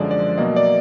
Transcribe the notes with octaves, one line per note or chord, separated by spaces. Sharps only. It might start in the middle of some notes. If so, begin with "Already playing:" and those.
Already playing: F#2 D3 F3 G#3 D5
D5
B2 F#3 A#3 D#5
D5